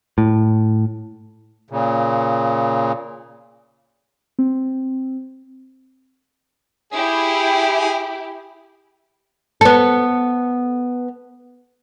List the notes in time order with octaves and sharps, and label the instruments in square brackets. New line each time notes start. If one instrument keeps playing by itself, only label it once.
[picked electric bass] A2
[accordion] A#2 C#3
[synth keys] C4
[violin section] E4 G4 [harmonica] G#4
[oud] B3 A4